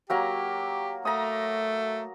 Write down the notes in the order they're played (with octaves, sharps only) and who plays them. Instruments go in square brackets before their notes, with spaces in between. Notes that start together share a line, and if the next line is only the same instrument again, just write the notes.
[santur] F#3 A#3 A#5 [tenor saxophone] G4
[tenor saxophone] A3 [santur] A#5 D#6